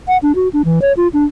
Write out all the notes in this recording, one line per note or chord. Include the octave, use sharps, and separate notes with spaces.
F#5
D4
F#4
D4
E3
C#5
F4
D4